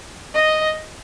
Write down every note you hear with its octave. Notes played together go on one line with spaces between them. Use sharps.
D#5